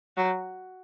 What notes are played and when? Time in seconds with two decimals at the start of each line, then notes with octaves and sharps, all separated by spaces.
0.17 F#3